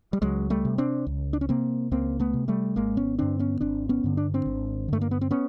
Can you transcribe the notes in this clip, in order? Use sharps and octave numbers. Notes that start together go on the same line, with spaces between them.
G3
C#2 F#3 G#3
G3 A3
C3
C4 D4
C#2
D4
C#4
C3 A#3 C4
C#2 A#3 C4
A3 B3
C3
G3 A3
G#1 G#3 A#3
B3 C#4
G2 D3 C4 D4
B3 C#4
G#1 C4 D4
B3 C#4
G2 D3
D4
C4 D4
G#1
G2 D3 A3
A#3
B3
C4
B3 C#4